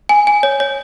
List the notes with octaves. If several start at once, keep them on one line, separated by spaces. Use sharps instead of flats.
G#5
G#5
C#5
C#5